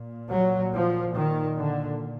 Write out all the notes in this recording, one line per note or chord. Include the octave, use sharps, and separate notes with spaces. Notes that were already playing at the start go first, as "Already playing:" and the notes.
Already playing: A#2
F#3
F3
D#3
D3